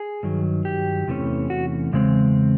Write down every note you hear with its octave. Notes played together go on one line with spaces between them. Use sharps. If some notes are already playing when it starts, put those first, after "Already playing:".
Already playing: G#4
G2 D#3 F#3
G4
E2 C3 E3 A3 C#4
F#4
E2 C#3 G#3 C4